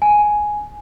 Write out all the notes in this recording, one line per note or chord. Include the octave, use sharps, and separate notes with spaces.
G#5